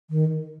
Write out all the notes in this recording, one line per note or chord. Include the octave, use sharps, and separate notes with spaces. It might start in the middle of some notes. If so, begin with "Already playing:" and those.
D#3